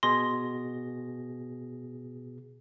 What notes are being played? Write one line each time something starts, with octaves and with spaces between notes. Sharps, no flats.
B2 G#4 C6 A#6